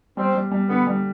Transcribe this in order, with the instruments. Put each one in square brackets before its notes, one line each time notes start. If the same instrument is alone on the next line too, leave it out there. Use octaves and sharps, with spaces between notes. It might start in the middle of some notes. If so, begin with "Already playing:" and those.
[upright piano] G3 [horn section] C4
[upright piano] G3
G3
[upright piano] D3 [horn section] B3
[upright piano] G3